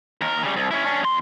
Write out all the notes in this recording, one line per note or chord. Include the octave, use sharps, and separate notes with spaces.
D#2 A#4
C#3 G3
C2
C#4 E4
C#4 D4
E2 C6